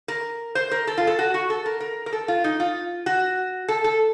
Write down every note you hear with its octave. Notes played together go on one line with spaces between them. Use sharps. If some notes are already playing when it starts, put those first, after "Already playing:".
A#4
C5
A#4
A4
F4
A4
F#4
F#4
A4
A#4
A#4
A#4
A4
F4
D#4
F4
F#4
A4
A4